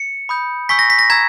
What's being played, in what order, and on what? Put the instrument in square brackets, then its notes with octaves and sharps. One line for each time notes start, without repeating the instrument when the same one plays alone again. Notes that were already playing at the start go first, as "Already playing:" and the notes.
Already playing: [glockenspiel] C#7
B5 D#6 G6
G#5 C#6 E6 G6 B6
A#6
B6
A#6
A#5 E6 G#6